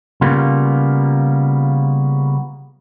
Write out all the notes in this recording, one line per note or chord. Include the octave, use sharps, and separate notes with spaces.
C#3 G3 A#3 B3 F4